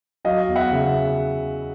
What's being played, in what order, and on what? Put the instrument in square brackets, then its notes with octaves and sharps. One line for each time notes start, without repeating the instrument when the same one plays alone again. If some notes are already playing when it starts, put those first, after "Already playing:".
[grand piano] F#3 D#5 F5
E2
E5 F#5
C#3